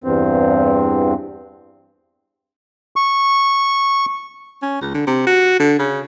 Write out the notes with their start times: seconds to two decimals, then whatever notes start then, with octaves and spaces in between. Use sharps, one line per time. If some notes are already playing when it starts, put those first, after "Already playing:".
0.04 E2 G2 C4
2.96 C#6
4.62 C#4
4.81 C#2
4.94 D3
5.07 C3
5.27 F#4
5.60 D3
5.79 C#3